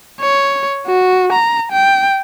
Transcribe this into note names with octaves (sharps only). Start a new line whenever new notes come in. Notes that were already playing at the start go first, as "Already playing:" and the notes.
C#5
F#4
A#5
G5